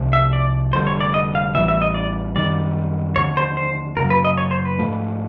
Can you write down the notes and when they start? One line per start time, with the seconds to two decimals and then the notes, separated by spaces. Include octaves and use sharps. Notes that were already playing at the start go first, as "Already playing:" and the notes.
Already playing: C2 C3 F3
0.13 E5
0.33 D5
0.73 F1 F2 D3 G3 C5
0.87 C#5
1.00 D5
1.14 D#5
1.35 F5
1.55 A1 A2 E3 G3 E5
1.68 E5
1.82 D#5
1.94 D5
2.35 F#2 D#3 G3 D5
3.16 D#2 D3 F3 C#5
3.37 C5
3.57 C5
3.97 F#2 C#3 F#3 A#4
4.10 B4
4.25 D#5
4.38 C#5
4.51 C5
4.65 B4
4.79 G#2 F3 A3